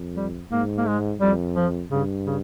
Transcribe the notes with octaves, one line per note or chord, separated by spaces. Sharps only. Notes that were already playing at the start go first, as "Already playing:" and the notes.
Already playing: F2
G3
G#2 A#3
A#3
G#3
F2 G3
F3
G2 C#3
C#3